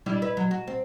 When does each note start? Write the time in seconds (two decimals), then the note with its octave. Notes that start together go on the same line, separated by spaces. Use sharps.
0.06 G3 D4 E4
0.22 E4 B4
0.37 F#3
0.51 F#4
0.67 C4